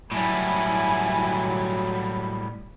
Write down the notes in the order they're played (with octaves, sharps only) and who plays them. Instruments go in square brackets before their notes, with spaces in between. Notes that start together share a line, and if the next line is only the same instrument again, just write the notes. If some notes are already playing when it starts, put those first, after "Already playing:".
[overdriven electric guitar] A2 G3 [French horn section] F#3 [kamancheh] E4 G#5